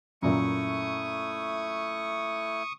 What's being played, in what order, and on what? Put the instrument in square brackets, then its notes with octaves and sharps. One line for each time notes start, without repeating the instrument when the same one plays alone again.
[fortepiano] F#2 A#2 [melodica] A3 E4 [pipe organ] C#6 D#6